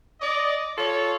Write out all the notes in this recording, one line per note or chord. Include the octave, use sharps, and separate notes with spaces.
D5 D#5
F4 A4 C#5